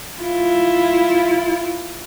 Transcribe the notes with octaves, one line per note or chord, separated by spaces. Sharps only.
E4 F4